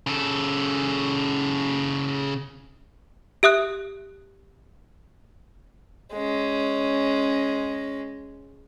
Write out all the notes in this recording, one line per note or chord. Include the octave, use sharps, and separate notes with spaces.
C#3 A4
G4 E5 D#6 F#6
G#3 C#4